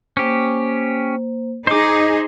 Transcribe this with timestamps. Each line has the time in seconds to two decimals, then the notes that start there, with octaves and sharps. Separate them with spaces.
0.17 A#3 C#4 G4 C5
1.67 D#4 G#4 C5 D6